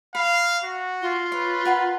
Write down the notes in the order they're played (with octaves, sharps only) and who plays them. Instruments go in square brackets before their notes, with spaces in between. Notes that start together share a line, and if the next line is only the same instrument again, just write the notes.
[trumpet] F5 [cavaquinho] B5
[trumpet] F#4
[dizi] F4
[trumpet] B4 [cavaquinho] C#5
[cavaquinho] A#4 F#5 B5